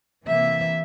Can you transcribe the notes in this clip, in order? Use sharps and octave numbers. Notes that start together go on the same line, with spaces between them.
C3 E3 A#3 E5